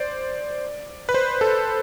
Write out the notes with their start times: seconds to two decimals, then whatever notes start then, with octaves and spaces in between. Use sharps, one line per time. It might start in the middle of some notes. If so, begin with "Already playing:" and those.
Already playing: C5 D5
1.09 B4
1.14 C5
1.41 A4